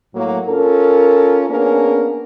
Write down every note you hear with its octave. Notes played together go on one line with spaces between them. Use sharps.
A2 F#3 A#3
C#4 F4 A4 A#4
A#3 B3 C#4 D4 G#4 A#4